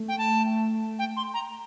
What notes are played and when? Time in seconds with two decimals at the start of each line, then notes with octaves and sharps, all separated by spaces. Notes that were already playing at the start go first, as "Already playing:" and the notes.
Already playing: A3
0.08 G5
0.18 A5
0.99 G5
1.17 C6
1.34 A#5